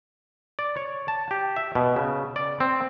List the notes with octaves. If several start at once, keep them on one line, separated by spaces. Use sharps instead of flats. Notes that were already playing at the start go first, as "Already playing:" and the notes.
D5
C#5
A5
G4
E5
B2
C#3
D5
C4